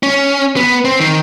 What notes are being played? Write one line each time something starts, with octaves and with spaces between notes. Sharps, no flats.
C#4
B3
C4
D#3